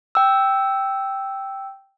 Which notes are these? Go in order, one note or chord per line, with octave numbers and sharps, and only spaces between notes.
G5 E6